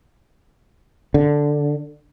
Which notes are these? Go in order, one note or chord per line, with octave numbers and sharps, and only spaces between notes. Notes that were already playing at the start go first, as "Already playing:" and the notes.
D3